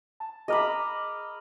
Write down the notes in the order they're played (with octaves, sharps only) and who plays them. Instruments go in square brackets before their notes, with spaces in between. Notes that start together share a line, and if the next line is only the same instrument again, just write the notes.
[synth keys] A5
[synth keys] G#4 D6 F6 [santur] D#5 A#5 B5